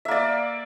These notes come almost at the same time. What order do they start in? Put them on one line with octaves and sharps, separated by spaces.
E5 A#3 D5